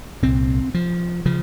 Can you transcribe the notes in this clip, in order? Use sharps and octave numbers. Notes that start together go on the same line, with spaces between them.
C2 A#2 C4
F3
C#3 F3